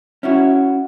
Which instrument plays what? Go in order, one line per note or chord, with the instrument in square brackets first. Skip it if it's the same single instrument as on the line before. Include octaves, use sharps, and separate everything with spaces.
[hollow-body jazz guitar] C#4 E4 F#4